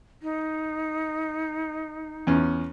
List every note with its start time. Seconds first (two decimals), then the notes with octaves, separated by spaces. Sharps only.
0.22 D#4
2.27 E2 C#4